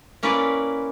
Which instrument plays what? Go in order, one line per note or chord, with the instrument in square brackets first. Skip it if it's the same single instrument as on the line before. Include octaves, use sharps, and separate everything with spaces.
[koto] A#3 C#4 E4 B4 D5